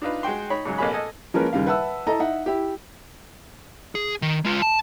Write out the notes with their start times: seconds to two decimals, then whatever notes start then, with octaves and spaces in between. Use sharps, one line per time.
0.02 D4 D#4 F4 B4
0.23 G#3 F#4 G5 C6
0.50 D#4 C#5 B5
0.65 G#2 C#3 F#3 G#3
0.78 A1 B2 A#3 C#4 G#4 B5
0.94 A4 D#5 G#5
1.34 F3 G#3 A#3 C#4 A#4 B4
1.53 D#2 C#3 G3 F5
1.67 B4 E5 F#5 A5 E6
2.07 E4 A4 D#5 A#5
2.19 D#4 E5 F#5
2.46 E4 G4
3.95 G#4
4.22 D#3
4.45 G#3 F4
4.62 A5